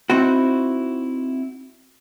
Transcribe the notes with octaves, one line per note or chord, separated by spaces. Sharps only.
C4 D#4 E4 F#4